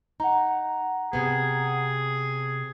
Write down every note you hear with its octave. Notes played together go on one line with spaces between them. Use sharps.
D#4 F#5 A#5
C3 B3 G#4